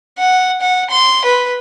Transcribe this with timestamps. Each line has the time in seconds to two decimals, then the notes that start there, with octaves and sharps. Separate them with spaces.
0.18 F#5
0.61 F#5
0.90 C6
1.24 B4